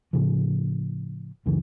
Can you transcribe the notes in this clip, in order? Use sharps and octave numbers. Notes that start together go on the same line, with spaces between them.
A2 C#3 F3
C#2 F#2 C#3 E3